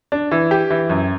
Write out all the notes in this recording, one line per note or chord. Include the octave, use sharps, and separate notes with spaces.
D4
E3
G4
E3
F#2